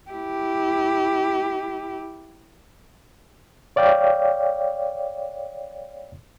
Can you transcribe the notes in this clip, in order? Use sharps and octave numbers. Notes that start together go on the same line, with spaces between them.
E4 G4
C#5 D5 F5 G5